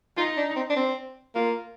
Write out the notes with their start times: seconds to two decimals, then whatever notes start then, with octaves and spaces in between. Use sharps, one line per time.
0.17 D#4 F4
0.37 D4
0.56 C4
0.70 D4
0.76 C4
1.35 A#3 F4